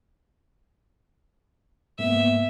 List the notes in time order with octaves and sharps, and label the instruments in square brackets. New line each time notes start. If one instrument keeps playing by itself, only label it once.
[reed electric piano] G#2 A#3 B3 [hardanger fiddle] E5